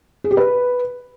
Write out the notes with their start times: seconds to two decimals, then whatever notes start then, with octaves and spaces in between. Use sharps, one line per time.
0.24 G#4
0.31 G4
0.37 B4